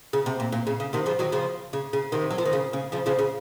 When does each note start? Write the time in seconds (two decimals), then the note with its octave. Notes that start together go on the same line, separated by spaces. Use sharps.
0.13 C#3
0.26 C3
0.40 A#2
0.52 A#2
0.67 C#3
0.80 C#3
0.93 C3 D#3
1.06 C#3 F3
1.19 D#3 F#3
1.32 C#3 F3
1.73 C#3
1.93 C#3
2.12 C3 D#3
2.30 F#3
2.38 F3
2.45 D#3
2.53 C#3
2.73 C#3
2.92 C#3 F3
3.06 C#3 F3
3.19 C#3